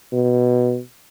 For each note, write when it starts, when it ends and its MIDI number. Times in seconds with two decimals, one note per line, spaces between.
0.12 0.79 47